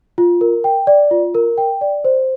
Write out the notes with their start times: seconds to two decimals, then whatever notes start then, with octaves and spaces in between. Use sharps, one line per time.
0.18 F4
0.41 A#4
0.64 G5
0.87 D5
1.11 F4
1.35 A#4
1.58 G5
1.81 D5
2.04 C5